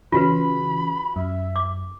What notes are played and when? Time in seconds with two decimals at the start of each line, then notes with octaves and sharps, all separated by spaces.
0.12 C#3 E3 F4 F#4 B4 B5
1.16 F#2 E5
1.56 D6